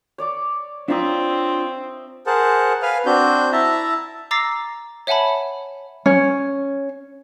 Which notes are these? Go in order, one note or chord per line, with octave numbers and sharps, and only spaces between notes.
C#5 D5 D6
C4 D4 F4 E5 A#5 D#6
G#4 A#4 C5 F#5 A5
B4 F5 G#5 F6
C4 D4 F#4 G6
E4 E5 A5 A#5
A#5 D6 E6 A6 A#6 C7
C#5 E5 F#5 G#5 A5 B5
C#4